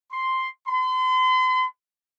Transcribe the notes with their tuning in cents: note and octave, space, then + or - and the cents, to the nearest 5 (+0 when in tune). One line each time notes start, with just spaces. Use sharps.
C6 +0
C6 -40